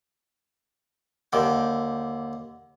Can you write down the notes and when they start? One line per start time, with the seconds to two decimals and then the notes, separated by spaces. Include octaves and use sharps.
1.33 D#2 D3 G5